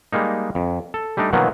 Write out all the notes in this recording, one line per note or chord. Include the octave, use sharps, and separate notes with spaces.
G3 G#3 A#3 D#4
F2
A4
G3 A3 D4 D#4
B2 D#3 F3 F#3 A#3 B3